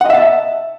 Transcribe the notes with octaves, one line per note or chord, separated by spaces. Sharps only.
D#5 E5 F#5 A5